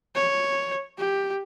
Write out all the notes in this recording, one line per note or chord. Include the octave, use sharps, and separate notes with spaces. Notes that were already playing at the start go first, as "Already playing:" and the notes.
C#5
G4